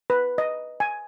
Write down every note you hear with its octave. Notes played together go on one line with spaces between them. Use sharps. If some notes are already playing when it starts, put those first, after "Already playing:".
B4
D#5
G#5